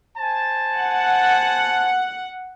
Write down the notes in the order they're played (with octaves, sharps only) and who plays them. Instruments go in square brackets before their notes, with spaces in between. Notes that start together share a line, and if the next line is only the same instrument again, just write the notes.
[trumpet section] C5 G#5 A5
[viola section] F#5